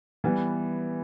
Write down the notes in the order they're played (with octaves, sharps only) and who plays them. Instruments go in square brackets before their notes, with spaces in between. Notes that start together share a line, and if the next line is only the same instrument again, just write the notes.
[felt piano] E3 G3 B3